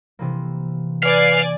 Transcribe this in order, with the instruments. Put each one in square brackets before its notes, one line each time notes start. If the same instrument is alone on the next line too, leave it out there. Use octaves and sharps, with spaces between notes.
[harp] C3 E3 A#3
[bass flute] B4 [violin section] D5 G#5 [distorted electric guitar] F5